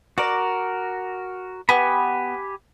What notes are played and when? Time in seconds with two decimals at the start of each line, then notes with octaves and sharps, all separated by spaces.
0.18 F#4 A#4 D5
1.69 B3 G4 G#5 B5